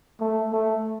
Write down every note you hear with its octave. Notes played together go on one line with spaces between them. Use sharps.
A3
A3